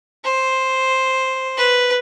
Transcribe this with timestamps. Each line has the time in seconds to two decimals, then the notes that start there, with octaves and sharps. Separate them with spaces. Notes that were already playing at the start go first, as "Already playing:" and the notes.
0.25 C5
1.57 B4